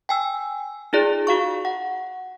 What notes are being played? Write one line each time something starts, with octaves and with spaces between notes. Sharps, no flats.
G5 G#5 E6
D#4 F4 G#4 D5
F#4 F5 C#6
F#5